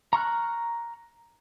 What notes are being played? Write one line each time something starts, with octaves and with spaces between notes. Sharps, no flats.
A#5 C#6 F6 F#6